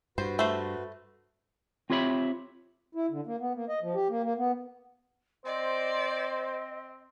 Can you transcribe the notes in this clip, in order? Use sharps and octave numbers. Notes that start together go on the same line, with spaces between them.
G2 F#4 B4 C5
A3 C5
C4 F4 G4 C#5 E5 B5
E4
D3
A#3
B3
A#3
D#5
F3
G4
A#3
A#3
B3
C4 C5 D5 D#5